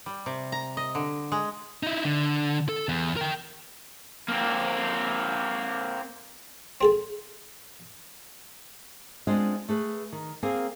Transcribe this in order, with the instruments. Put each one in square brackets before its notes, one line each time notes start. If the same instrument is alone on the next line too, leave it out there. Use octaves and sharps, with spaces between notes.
[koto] G3
C3
A#5
D#5
D3
G#3
[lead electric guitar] D#4 E4
D3
A4
E2
A#4 G5
[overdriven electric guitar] A#3 C4
[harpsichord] C4 G#4 A4
[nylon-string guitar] G#3 B3 C4 D4 F4 D#5
A3 G#4 B4
D#3
A#3 C4 G#4 A#4 F5 G#5